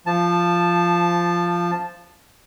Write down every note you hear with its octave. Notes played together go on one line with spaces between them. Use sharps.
F3 A5